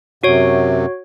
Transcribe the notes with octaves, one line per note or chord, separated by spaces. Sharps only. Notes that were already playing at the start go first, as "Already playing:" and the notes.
F#2 C3 F#4 C#5